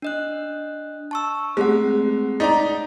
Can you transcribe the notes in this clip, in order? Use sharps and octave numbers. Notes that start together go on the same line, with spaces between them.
D4 D#5 F#6
A5 C#6 E6
G#3 A3 C4 F#5
D#4 D5 A#5 A6 B6